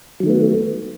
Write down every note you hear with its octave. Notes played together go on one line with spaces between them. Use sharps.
D#3 F#3 A3 B3